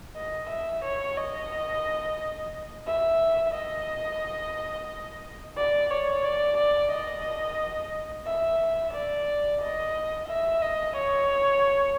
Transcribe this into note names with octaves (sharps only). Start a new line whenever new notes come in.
D#5
E5
C#5
D#5
E5
D#5
D5
C#5
D5
D5
D#5
E5
D5
D#5
E5
D#5
C#5